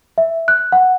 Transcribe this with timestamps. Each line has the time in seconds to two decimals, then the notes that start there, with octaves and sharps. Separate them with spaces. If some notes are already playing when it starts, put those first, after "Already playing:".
0.18 E5
0.48 F#6
0.72 F#5